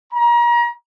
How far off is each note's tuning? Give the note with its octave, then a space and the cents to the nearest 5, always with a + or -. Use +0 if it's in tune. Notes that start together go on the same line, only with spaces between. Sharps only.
A#5 +35